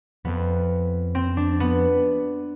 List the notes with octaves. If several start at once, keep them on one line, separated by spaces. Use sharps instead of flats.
F2 B3
C4
D4
B3